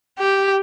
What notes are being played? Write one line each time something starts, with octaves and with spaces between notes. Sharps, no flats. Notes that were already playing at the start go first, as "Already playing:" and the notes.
G4